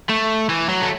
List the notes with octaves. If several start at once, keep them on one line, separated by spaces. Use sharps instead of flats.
A3
E3
F#3
A3